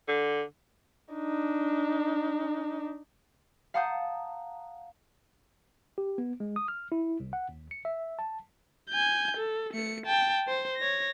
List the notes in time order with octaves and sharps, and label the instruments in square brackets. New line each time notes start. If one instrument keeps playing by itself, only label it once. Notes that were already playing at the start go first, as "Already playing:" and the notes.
[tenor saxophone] D3
[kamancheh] D4 D#4
[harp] F5 F#5 A5 A#5 D#6 G6
[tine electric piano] G4
B3
G#3
D#6
F6
E4
C2
F#5
D#2
C#7
E5
A5
[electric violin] G#5 G6
A4
A3 C#7
G5 A5
C5
C#5 A#6